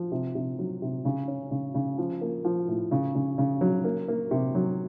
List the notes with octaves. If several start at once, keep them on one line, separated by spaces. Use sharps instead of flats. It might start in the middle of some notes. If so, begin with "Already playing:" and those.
Already playing: F3
C3
C3
F#3
C3
C#3
C#4
C#3
C#3
F3
A#3
F3
A2
C#3
C#3
C#3
F#3
A#3
A#3
C3
F#3